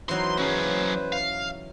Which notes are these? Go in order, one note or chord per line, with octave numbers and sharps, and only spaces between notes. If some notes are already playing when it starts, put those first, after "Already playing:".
E3 F#3 D#4 B4 C5 C6
F#3 C#4 G#4
F5